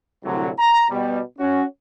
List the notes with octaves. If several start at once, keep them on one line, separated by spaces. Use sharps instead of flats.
C2 A2 D3 F#3
A#5
B2 G3
C#4 F#4